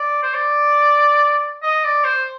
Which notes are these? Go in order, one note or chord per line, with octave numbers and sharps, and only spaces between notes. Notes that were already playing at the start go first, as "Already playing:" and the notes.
Already playing: D5
C5
D5
D#5
D5
C5